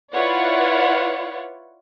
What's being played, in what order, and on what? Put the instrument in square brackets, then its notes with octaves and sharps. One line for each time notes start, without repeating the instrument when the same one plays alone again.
[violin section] E4 F4 B4 C#5 D5 F#5